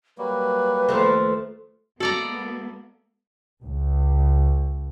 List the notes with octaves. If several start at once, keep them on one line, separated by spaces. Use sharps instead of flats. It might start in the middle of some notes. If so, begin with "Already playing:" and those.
F#3 G3 A#3 B4
D#2 F3 A3
G#3 A#3 B3 F#4 A4 D5 A#5
C#2